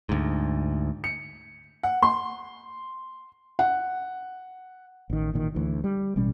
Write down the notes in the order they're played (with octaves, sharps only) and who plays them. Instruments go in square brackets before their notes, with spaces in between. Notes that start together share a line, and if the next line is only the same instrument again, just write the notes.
[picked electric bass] D2 G#2
[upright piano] C#7
F#5
C6
[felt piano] F#5
[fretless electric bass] A1 D#3
A1 A#2 D#3
D2 E3
G3
A1 B2 G3 C#4